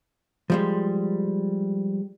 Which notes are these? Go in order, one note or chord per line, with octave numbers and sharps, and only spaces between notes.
F3 G3 G#3